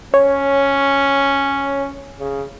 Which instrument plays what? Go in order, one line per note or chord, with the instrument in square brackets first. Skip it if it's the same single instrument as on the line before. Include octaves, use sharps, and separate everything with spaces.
[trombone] C#4 [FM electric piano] C#5
[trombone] C#3